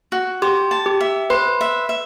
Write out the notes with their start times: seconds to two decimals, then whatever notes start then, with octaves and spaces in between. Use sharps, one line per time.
0.12 F#4
0.42 G4 C5
0.71 A5
0.86 G4
1.01 E5
1.30 B4 C5
1.61 E5
1.89 E5